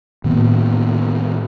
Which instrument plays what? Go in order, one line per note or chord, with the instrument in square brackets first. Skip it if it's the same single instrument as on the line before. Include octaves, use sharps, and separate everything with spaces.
[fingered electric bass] A2 D#3 A#3 B3